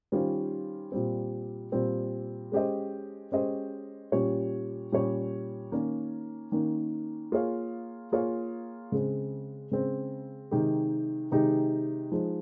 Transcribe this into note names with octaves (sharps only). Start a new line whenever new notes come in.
D#3 G3 C#4 F4 C5
A#2 G3 C4
A#2 G3 C4
G#3 C#4 G4 C5 D#5
G#3 C#4 G4 C5 D#5
A#2 G3 C#4 G4 C#5
A#2 G3 C#4 G4 C#5
D#3 A#3 C#4
D#3 A#3 C#4
A#3 F4 G#4 C#5 F5
A#3 F4 G#4 C#5 F5
C#3 G#3 C4
C#3 G#3 C4
C3 D#3 G#3 D#4 G4
C3 D#3 G#3 D#4 G4
F3 G#3 D#4